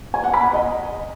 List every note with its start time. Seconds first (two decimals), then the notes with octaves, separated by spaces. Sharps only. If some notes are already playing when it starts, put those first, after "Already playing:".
0.14 G#5
0.24 F#5
0.34 B5
0.43 G#5
0.53 D#5